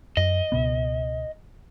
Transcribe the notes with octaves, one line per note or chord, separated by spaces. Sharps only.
F#2 D#5
C#2 B2 B3